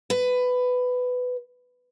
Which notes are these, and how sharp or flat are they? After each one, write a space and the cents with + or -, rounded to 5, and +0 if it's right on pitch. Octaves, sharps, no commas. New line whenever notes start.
B4 +15